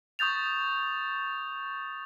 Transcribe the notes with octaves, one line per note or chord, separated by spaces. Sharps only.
C#6 D#6 G6 A6 F7